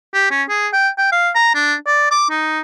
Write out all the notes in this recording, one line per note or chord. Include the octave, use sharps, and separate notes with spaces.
G4
C#4
G#4
G5
G5
F5
A#5
D4
D5
D6
D#4